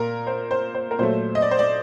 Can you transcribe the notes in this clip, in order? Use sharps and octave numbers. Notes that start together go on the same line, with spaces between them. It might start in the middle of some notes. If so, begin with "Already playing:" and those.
Already playing: A#2 A#4
C5
C5
C5
A#4
A#2 F#3 A3 C5
D#5
D5
C5
D5